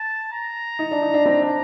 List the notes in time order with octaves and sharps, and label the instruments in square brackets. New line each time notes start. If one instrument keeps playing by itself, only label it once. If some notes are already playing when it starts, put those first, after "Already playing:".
Already playing: [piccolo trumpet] A5
A#5
[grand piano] D#4
D4
D#4
D4
[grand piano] C4 [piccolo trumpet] A#5
[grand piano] D4